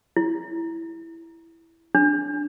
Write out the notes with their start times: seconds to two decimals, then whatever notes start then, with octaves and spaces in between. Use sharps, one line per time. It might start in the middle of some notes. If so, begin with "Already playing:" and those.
0.17 E4
1.95 D4